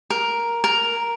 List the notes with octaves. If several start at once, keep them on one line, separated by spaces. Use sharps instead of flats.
A#4
A#4